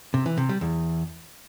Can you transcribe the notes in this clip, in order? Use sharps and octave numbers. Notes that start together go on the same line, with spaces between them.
C3
E3
C3
G3
E2